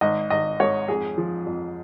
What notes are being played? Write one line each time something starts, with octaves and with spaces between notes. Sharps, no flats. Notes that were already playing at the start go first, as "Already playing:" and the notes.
G#1 D#5
G#1 D#5
G#2 C#5
F2 G#4
F3
F2